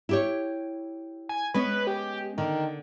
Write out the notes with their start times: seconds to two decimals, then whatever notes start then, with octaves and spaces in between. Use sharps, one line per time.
0.09 E4 G4 C#5
1.29 G#5
1.54 G#3 B3 C#4 B4
1.87 G4
2.38 D3 D#3